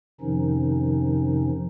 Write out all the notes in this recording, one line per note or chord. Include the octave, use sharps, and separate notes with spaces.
F2 C3 D#3 F3 C#4 D#4